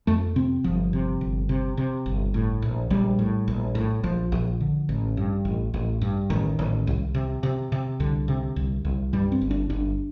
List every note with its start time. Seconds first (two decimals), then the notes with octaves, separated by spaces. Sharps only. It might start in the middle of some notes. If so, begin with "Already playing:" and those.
0.07 F2 A3
0.36 C3 C4
0.64 G1 F3
0.93 C3
1.21 G1
1.49 C3
1.77 C3
2.06 G1
2.34 A2
2.62 A#1
2.90 A#1 G3
3.19 A2
3.48 A#1
3.75 A2
4.04 A#1 F3
4.32 A#1
4.61 D3
4.89 A1
5.17 G2
5.45 A1
5.74 A1
6.01 G2
6.30 A1 D#3
6.59 A1
6.87 C2
7.15 C3
7.43 C3
7.72 C3
8.00 C2 D3
8.28 C3
8.56 C2
8.85 C2
9.13 G2 G3
9.32 C4
9.41 G1
9.51 D4
9.70 G1 D4